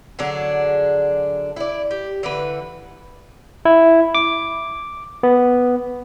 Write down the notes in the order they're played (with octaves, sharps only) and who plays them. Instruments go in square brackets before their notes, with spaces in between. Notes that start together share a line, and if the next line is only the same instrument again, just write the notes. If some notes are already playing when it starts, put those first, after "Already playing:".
[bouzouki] D3 F#3 D4 G#4
E4 D5
G4
D3 E3 B4
[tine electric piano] E4
D6
B3